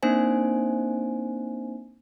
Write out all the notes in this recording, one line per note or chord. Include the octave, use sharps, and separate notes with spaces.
A#3 C4 D4 D#4 C5 G#5